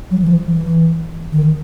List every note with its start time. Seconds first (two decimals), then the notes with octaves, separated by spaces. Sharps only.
0.11 F#3
0.22 E3
0.28 F3
0.46 E3
1.32 D#3